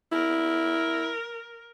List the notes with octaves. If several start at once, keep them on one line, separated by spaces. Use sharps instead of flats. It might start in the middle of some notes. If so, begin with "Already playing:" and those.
E4 A#4